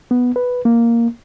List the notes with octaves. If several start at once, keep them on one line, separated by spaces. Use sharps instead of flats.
B3
B4
A#3